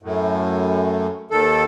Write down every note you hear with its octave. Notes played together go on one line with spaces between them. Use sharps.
F#2 A2
D#2 D#3 A4